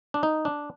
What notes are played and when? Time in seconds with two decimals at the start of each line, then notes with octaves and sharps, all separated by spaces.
0.14 D4
0.23 D#4
0.45 D4